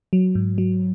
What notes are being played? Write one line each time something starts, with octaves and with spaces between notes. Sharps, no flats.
F#3
G#2
F#3